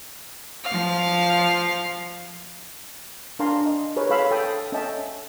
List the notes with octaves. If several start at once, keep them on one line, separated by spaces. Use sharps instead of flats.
F3 F5
D4 A#4 F5 G#5 A#5 C6
D4 D#5
G#4 A#4 B4 C#5
G#4 A4 F5 B5 E6
A4 G5 D#6
C#4 A4 D#5 E5 G5 A5